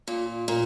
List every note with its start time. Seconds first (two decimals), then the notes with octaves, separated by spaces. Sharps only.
0.08 A#2
0.48 A#2